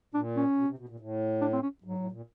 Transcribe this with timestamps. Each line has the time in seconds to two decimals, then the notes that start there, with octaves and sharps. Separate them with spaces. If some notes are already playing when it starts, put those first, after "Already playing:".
0.14 A#2 D4
0.36 C#4
0.57 B2
0.68 C3
0.78 B2
0.89 A#2
1.00 A2
1.41 D4
1.53 C4
1.63 C#4
1.84 G#2 F#3
1.98 A2
2.12 A#2